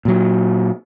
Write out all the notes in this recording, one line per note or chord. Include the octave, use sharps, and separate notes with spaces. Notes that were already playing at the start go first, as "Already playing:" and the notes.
A#2 F#3